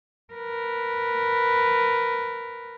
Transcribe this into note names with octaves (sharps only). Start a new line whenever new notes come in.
A#4 B4